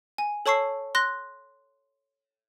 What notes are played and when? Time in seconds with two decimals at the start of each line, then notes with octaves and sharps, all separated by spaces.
0.18 G#5
0.46 A4 C#5 A5 C#6 E6 C7
0.95 C6 F#6 A#6